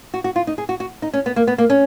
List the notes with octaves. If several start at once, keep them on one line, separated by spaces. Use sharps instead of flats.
F#4
F#4
F4
D#4
G#4
F#4
F#4
D#4
C#4
B3
A#3
B3
A#3
C#4